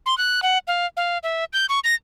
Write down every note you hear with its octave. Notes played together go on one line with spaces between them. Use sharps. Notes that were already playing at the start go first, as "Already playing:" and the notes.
C6
F#6
F#5
F5
F5
E5
G6
C#6
A#6